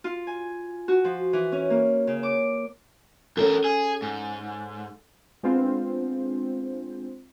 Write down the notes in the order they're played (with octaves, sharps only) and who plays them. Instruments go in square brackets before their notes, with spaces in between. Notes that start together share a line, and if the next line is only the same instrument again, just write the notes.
[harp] F4
G#5
F#4
F3
E3
C#4
A#3
C#3
D6
[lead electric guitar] E2 A#4 [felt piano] C#4 A4
[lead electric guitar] G#4
G#2
[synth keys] G#3 B3 C4 D4 F4 C5